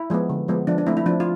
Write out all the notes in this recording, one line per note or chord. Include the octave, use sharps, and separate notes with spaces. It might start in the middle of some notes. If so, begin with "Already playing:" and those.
Already playing: E4
F3 G#3 B3
D3
F3 G#3 B3
F3 D4
D4
A3 C4 E4
E4
F3 D4
F4